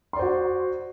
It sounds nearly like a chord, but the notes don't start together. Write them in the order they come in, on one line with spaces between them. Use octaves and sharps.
C6 D5 C5 F#4